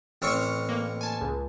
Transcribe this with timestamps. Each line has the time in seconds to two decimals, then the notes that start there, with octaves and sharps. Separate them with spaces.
0.22 A1 C4 C#5 C#6 E6 F6
0.69 A#3
1.01 G#5 A5
1.21 C#2